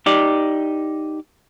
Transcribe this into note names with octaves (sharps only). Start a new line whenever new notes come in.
D#4 G4 D5